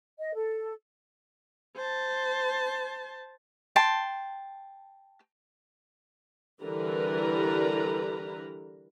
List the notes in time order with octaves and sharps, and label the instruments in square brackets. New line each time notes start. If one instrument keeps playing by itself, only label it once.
[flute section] D#5
A4
[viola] C5 A5
[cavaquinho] G5 A5 C6
[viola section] D3 E3 G3 A#4 B4 A#5